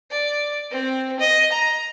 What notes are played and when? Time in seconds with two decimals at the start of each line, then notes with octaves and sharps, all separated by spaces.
0.11 D5
0.71 C4
1.20 D#5
1.52 A#5